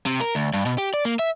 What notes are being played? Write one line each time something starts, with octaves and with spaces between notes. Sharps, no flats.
C3
A#4
D2
G2
B2
G4
D5
A#3
E5